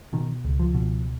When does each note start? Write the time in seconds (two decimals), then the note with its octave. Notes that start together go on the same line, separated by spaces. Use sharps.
0.13 B2 D#3
0.44 C#2
0.60 F3
0.75 B2